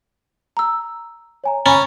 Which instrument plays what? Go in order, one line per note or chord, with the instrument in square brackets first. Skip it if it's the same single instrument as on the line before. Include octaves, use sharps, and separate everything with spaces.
[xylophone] A#5 E6
[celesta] C#5 G#5 A#5
[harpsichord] C#4 [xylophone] G#5 A6 [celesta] A#5 B5